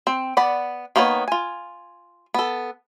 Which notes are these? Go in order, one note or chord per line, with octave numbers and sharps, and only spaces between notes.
C4
B3 D5 F#5 B5
D#3 A#3 B3 B4 C#5
F4 G#5
B3 A4